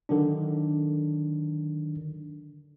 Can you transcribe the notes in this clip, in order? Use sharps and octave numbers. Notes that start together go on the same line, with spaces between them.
D3 D#3 F#3 D4